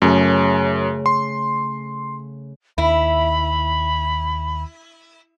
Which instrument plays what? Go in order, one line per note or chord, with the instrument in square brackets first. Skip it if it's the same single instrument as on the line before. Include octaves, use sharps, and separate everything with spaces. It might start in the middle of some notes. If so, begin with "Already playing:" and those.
[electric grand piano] F#2 [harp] C#3 A3
[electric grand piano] C6
[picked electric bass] D#2 [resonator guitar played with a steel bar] E4 [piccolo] B5